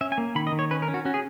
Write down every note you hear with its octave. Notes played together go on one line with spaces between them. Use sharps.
C#4 E5
G#5
A#3
D#3 B5
D#5
D#3
C#5
C#4 B4
A#4
C#4
F#4
C#4 F#4
G#4